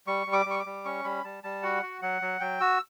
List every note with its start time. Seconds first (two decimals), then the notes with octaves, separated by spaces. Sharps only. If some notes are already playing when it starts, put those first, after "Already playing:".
0.07 G3 C#6
0.27 G3
0.33 D6
0.46 G3 C#6
0.59 D6
0.66 G3
0.85 C#4 C#6
1.04 G3 B5
1.24 G3 A5
1.44 G3 A5
1.63 F#4 F#5
1.83 F#4
2.02 F#3 F#5
2.22 F#3
2.40 F#3 G5
2.60 F#4 E6